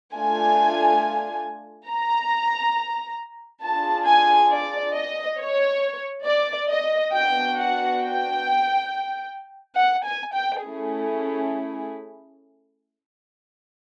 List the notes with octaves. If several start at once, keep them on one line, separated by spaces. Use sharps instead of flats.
A3 D4 F4 G#5
A#5
D4 F4 G#4 A5
G#5
D5
D#5
C#5
D5
D#5
B3 D4 F#4 G5
F#5
G5
F#5
G#5
G5
A3 C#4 E4 G#4